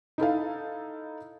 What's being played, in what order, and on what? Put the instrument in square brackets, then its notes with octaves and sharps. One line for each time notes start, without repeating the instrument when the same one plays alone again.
[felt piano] D#4 E4 A4 F5